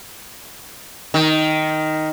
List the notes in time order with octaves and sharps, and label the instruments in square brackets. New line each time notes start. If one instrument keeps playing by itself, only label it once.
[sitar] D#3